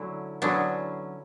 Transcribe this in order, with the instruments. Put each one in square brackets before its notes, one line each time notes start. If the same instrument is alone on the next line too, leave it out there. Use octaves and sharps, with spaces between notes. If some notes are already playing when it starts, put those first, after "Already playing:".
Already playing: [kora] D3 F#3 C#4 E4 [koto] A3
[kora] D3 F#3 C#4 E4 [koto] B3 D4